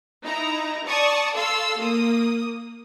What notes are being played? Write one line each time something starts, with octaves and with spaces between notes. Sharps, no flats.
D#4 E4 A#5
D5 A5 C#6 D#6
A4 F5 C6 E6
A#3 D#6